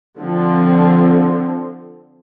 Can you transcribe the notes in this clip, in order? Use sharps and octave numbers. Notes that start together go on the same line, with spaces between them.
D3 F3 C4